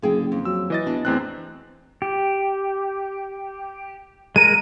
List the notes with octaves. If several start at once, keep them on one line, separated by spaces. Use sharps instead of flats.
F#1 D3 G#4 G5
F2
F#3 E6
E3 D#5 A6
E2 D4
E2 A2 C4 F#6
G4
G#3 A#4 D#7